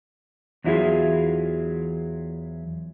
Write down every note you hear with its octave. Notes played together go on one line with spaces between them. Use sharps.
E2 F#3 E4 F4 G#4